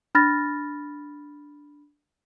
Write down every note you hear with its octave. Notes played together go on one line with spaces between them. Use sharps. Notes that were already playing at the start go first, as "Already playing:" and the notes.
D4 B5 F6 A6 A#6